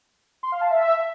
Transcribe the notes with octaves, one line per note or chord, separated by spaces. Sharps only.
C6
F5
A5
E5